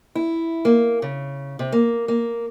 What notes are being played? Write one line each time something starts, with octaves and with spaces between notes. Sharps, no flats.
E4
A#3
C#3
C3
A#3
A#3